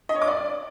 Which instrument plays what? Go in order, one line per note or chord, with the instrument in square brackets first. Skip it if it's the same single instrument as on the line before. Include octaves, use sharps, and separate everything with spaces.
[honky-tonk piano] D#5
C#5
D6
D5